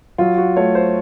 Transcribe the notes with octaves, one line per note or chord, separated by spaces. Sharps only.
F#3 F4
F#4
A3 C#5
C5